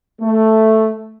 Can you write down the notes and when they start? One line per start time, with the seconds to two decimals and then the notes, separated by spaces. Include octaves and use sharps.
0.21 A3